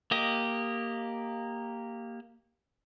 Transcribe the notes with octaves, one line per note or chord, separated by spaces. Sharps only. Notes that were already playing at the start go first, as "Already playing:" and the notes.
A#3 G4 D#5